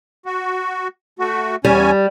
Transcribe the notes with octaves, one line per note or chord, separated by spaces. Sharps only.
F#4
A3 F#4
E2 G3 C#4 G#5